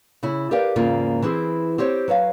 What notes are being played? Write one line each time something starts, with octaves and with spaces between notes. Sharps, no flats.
C#3 E4
G4 A#4 B4 D5 F5 G5
E2 G#2 C#3 A#3 F4 A#4
E3 C4 E4 G#4
C4 G4 C5 C#5
F#3 B4 C#5 F5